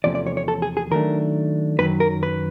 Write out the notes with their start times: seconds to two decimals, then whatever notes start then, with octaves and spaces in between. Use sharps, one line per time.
0.04 E2 C3 F3 A3 C#4 D5
0.15 D5
0.27 C#5
0.37 C#5
0.48 A4
0.62 G#4
0.77 G#4
0.91 D#3 F#3 A3 D4 A#4
1.79 F#2 D#3 F#3 B4
2.00 A#4
2.23 B4